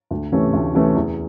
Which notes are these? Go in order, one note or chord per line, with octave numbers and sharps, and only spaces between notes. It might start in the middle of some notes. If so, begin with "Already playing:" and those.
D2
C3 E3 A3 C#4
D2
C3 E3 A3 C#4
E2